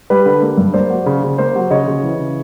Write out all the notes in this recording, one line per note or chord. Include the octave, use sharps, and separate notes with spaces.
G3 B4
D3
A#3
G2
A#3 C5 D5
F#3
C#3
C#3
A#3 C5
F#3
C#3 C#5 D#5
C#3
E3
C#3